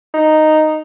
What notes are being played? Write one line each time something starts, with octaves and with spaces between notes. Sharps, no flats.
D#4